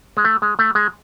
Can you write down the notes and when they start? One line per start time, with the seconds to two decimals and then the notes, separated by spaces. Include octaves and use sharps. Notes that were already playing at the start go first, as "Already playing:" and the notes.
0.17 G#3
0.25 A3
0.42 G#3
0.59 A3
0.75 G#3